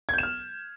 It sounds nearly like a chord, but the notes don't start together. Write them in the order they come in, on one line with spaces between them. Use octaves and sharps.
G#6 G6 E7 F6